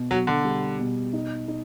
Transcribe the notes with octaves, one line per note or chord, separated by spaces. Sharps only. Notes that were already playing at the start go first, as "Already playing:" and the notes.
Already playing: B2
B2 F#3
D3
G3
B2
D#4
D#4